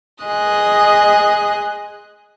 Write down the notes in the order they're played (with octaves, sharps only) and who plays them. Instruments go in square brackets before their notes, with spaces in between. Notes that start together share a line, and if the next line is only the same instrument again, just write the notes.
[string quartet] G#4 D#5 C6 D#6 F#6